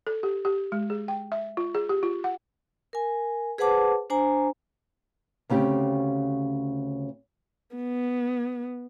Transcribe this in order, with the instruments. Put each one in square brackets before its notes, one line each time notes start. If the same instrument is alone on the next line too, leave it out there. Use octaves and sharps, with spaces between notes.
[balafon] A4
G4
G4
G#3
G#4
G5
E5
F4
G#4
G4
F4
F#5
[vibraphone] A#4 G#5
G#4 B4 C5 F#5 A5 D6
D4 C5 G#5 A#5
[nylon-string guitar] D2 C#3 C4 G4
[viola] B3